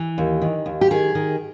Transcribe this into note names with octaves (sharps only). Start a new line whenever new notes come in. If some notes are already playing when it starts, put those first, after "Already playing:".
Already playing: E3
D#2
D#3
D#2
G4
D#3 G#4
D#3